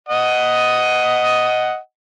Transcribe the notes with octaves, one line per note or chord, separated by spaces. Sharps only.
D#5 F#5 D#6